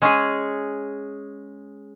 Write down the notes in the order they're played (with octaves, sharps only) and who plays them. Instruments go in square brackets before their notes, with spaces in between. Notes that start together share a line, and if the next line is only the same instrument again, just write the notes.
[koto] G#3 C#4 G#4